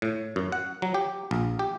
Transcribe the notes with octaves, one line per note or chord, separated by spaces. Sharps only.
A2
F#2
F#5
F#3
G4
A#1
G4